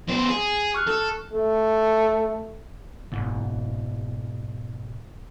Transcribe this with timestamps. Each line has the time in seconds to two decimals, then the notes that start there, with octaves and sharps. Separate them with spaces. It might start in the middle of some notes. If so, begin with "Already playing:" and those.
0.09 B3 C5
0.29 G#4
0.74 C#6 F6 F#6
0.87 A4
1.33 A3
3.12 F#1 G#2 B2